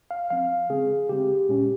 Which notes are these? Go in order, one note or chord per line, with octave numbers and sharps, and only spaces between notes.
F5
F3 C4 F5
C#3 G#3 C4 G#4
C#3 G#3 C4 G4
A#2 G#3 C#4